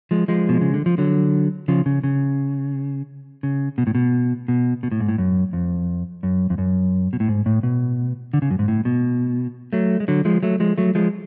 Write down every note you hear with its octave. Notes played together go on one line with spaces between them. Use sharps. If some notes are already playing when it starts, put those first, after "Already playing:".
F3 G#3
F3 G#3
B2
C#3
D3
F3
D3 F#3
C#3 F3
C#3
C#3
C#3
B2
A2
B2
B2
B2
A2
G#2
A2
F#2
F2
F#2
F2
F#2
B2
A2
G#2
A2
B2
D3
C#3
F#2
G#2
A2
B2
F#3 A3
G#3
D3 F#3
F3 G#3
F#3 A3
F3 G#3
F#3 A3
F3 G#3